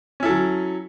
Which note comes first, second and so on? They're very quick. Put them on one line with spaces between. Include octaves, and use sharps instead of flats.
C#4 E4 A4 F#3